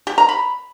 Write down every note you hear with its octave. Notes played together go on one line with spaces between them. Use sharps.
G4
A#5
B5